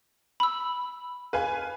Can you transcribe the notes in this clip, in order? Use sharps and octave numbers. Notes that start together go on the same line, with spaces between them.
B5 E6
B4 F5 G#5